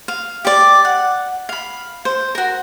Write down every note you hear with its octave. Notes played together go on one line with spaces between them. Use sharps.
F5
G4 D5
F#5
F5 B5
C5
F#4 A#4